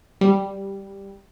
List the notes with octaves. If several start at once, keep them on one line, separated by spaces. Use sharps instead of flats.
G3